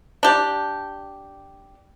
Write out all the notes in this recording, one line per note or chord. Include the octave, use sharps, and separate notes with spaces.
D4 G4